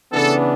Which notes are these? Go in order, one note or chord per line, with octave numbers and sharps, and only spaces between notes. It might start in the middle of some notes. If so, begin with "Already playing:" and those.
C#3 E3 B3 D4 A4